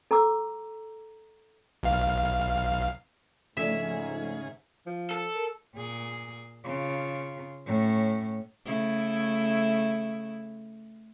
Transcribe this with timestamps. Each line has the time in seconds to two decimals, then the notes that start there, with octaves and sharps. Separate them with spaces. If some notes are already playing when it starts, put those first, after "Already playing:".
0.11 A4 A#5 D6 E6
1.83 B1 F5
3.57 G#2 C#3 F3 A3 D4 G#4 E5
4.86 F3
5.11 A4
5.35 A#4
5.75 A#2 G#4
6.65 C#3 F4
7.66 A2 C#4
8.65 C#3 A3 E4